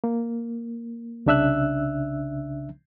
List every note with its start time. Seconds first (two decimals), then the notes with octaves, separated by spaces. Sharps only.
0.04 A#3
1.26 C2 C#3 D4 E5 E6 F#6